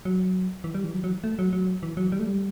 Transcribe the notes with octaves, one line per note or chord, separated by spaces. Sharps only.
F#3
E3
G3
E3
F#3
F#3
A3
F#3
F#3
E3
F#3
G3
A3
G3